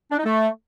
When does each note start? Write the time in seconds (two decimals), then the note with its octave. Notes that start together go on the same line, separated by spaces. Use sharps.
0.11 D4
0.18 D#4
0.25 A3